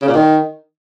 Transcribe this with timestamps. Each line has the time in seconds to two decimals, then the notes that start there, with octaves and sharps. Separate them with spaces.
0.02 C#3
0.08 A#2
0.14 D#3